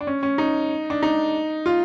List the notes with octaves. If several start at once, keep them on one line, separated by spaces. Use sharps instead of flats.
D4
C#4
C#4
D#4
D4
D#4
F4